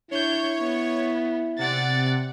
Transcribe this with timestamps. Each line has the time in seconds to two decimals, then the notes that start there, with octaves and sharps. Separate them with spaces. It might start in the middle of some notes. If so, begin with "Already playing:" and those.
0.11 D4 E4 C#5 G6
0.60 B3
1.58 C3 D5 F#5 A6